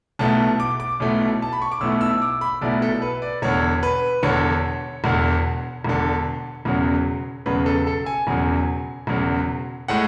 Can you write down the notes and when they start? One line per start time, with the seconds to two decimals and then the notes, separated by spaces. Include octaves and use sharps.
0.19 B1 B2 A3 E4 A5
0.60 D6
0.80 D6
1.00 B1 B2 A3 E4
1.42 A5
1.53 B5
1.62 C#6
1.72 D6
1.81 B1 B2 A3 E4 E6
2.01 E6
2.22 D6
2.41 B5
2.61 B1 B2 A3 E4 D5
2.82 A4
3.02 B4
3.22 D5
3.42 E1 E2 D3 C#5
3.83 B4
4.23 E1 E2 D3 C#5
5.04 E1 E2 D3
5.85 E1 E2 D3
6.65 E1 E2 C#3 F#3
7.46 E1 E2 C#3 F#3 B4
7.66 A4
7.87 A4
8.06 G#5
8.27 E1 E2 C#3 F#3
9.07 E1 E2 C#3 F#3
9.88 A2 G#3 F#5